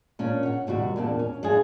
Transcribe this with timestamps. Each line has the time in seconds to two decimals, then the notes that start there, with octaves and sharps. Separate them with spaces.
0.19 A#2 C#4 D4
0.43 C#5 F#5
0.67 D#2 C3 G3 F#4
0.96 E2 A#2 C4 D4
1.19 C#4
1.43 F#2 D4 F4 G#4